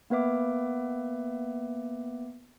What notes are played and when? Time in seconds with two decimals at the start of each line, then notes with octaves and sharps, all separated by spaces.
0.10 A#3 B3 B4 E5 D6